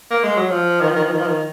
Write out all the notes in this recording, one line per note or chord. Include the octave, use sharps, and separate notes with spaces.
A#3
G#3
F#3
F3
D#3
F3
D#3
F3
D#3
F3
D#3